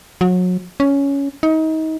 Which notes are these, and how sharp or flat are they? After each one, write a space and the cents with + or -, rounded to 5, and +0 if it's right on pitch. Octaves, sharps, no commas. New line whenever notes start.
F#3 -30
C#4 +10
D#4 +30